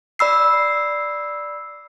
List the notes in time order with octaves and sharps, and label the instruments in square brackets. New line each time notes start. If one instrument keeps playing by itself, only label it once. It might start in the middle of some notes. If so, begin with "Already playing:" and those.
[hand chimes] D5 B5 E6 C7